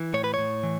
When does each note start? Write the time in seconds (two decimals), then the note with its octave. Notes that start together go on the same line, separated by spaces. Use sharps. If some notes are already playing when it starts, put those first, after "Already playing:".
Already playing: E3
0.14 A2 C#5
0.24 B4
0.34 A2 C#5
0.63 E3